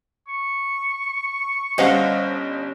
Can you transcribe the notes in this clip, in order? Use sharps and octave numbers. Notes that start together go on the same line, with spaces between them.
C#6
G1 G3 C#4 C5 D#5 F5 F#5